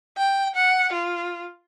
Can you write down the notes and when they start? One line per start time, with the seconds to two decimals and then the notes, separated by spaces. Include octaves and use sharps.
0.17 G5
0.55 F#5
0.93 F4